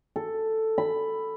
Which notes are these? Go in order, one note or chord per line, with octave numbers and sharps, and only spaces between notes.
A4
B5